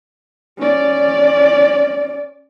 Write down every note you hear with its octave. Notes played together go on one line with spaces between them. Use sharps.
C#4 D5